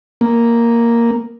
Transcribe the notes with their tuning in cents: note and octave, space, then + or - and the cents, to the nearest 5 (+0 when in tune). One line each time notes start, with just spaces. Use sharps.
A#3 +0